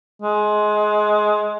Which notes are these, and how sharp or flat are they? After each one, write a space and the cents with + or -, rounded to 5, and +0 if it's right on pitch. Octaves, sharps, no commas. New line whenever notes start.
G#3 +20